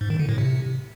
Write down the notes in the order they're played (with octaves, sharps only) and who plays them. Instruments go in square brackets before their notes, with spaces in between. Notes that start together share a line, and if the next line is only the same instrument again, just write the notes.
[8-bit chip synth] G#2
D#3
D3
A2
C3